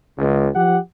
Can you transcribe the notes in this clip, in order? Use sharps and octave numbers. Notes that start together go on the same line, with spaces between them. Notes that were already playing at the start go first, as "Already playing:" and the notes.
C#2
F3 G4 F#5